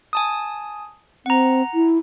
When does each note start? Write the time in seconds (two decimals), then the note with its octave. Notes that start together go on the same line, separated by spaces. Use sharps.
0.13 G#5 A5 D#6
1.26 C4 F#5 A#5
1.74 E4